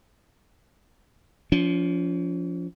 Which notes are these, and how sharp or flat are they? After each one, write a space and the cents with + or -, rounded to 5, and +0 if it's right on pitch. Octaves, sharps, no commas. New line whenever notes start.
F3 +0 C#4 +45